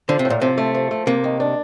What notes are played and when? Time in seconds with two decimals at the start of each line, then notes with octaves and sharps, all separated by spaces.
0.09 D3 F3
0.19 C3
0.25 A2
0.30 A#2
0.42 C3 F3
0.58 A3
0.74 F3
0.91 A3
1.07 C3 A#3
1.24 D#3
1.40 D4